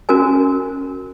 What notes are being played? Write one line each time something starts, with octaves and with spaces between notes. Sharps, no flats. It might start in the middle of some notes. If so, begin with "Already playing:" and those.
C#4 F#4 A#4 G#5